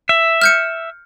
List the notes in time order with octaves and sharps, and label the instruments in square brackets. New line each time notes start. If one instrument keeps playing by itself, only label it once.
[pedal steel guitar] E5
[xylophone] F6 G6 C#7